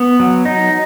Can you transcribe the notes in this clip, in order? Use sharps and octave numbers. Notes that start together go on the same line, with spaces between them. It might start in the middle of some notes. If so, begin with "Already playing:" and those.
Already playing: B3
F#3
D#4